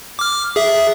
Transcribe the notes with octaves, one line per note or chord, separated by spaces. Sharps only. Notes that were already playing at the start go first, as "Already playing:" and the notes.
D6 F6
G#4 E5